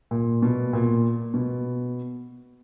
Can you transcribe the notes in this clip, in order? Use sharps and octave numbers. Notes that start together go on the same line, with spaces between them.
A#2
B2
A#2
B2